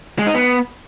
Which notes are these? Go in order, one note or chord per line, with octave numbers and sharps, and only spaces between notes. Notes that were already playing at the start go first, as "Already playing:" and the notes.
G#3
D#4
B3